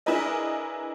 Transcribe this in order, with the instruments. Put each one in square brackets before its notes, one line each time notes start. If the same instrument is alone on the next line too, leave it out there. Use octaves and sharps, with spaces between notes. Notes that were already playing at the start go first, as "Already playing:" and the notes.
[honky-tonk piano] D4 E4 G#4 A#4 B4 D#5